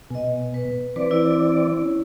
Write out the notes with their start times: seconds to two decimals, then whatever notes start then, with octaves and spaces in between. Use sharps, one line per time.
0.10 B2 D#5 G#5
0.54 B4
0.96 E3 C4 B4 D5
1.11 E4
1.82 C#4